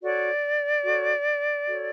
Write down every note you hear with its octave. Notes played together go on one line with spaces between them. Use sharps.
F#4 A4 C#5 D5
F#4 A4 C#5
F#4 A4 C#5